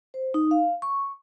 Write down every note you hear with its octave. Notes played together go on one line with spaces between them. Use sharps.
C5
D#4
F5
C#6